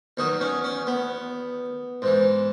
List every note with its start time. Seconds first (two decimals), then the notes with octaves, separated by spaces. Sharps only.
0.17 E2 D#3 F#3 D#4
0.41 C#4
0.64 C#4
0.87 B3
2.02 G#2 E3